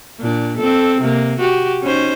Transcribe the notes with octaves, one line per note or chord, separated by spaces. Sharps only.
A#2 D4
C4 A4
C3 A#3
F#4 G4
C#4 D#4 C5